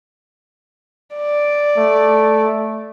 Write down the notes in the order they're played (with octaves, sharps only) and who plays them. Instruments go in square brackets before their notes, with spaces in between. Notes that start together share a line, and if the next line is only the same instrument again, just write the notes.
[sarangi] D5
[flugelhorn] A3